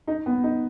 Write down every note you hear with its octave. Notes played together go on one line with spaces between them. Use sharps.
D#4
B3
D#4